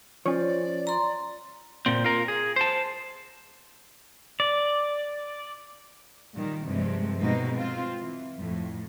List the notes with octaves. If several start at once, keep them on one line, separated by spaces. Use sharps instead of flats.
F3 C#4 C#5 D5
A#5 C6
A#2 C4
F4 A#4
G#4
C5 A5
D5
A#2 D#3 G3
G2 C3 F3 G#3 A3
B2 G#3 C4 D#4
C4 F4
E3
F2 A2